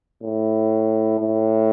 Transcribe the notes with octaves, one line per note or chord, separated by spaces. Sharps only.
A2
A2